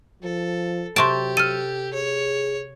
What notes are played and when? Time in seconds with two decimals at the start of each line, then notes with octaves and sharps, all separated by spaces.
0.22 F3 A4
0.96 C3 F#3 G4 A5 C6 C#6 D7
1.37 A4 F6 D#7
1.94 G#4 C#5